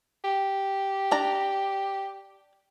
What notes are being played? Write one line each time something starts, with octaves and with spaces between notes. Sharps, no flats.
G4
D4 A#5